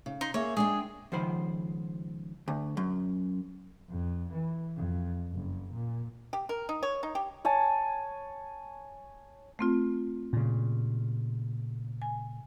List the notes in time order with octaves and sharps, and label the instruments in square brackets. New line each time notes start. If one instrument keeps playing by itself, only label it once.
[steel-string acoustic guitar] C#3
[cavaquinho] D#4 C6
[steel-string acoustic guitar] A#3 G#4 E5 [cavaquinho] C#5
[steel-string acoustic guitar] G#3 D4 G5 [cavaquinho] G#4
[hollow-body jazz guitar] C#2 D#3 F3 C5 B5
D2
F#2
[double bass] F2
E3
F2
F#1
A#2
[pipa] G4
A#4
D#4
C#5
D#4
G4
[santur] C#5 G#5 A5
[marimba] A3 C4 F4
[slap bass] A#2 C#3
[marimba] G#5